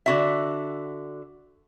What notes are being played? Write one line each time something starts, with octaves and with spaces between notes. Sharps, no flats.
D3 F#4 E5